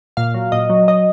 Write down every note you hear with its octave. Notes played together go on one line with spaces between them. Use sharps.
A#2 F5
F#3
A#2 D#5
F#3
F#3 D#5